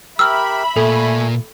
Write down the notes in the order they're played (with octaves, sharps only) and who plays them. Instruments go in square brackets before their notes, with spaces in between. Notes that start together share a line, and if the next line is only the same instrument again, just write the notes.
[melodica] G4 A#4 [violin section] E5 B5 [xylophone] E6 F6
[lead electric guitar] A#2 [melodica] A3 G#5 [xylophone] A4